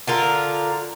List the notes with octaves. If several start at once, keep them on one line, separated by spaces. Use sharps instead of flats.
D3 F4 A#4